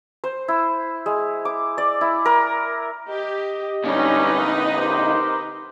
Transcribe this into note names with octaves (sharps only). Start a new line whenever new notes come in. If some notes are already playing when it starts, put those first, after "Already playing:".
C5
E4
G#3
D6
D5
E4
A#4
G4 D#5
A#2 D3 G3 C#4 D#4 B4
G4 A#4 C5